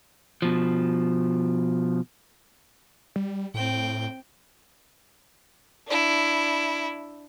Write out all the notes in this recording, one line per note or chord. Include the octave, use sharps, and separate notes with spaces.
B2 F3
G3
A2 C4 G5
D4 E4